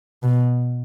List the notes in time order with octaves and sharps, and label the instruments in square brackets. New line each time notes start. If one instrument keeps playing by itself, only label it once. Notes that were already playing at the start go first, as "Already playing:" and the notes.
[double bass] B2